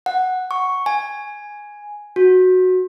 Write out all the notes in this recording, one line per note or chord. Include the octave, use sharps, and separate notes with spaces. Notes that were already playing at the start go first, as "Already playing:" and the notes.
F#5
C#6
G#5
F#4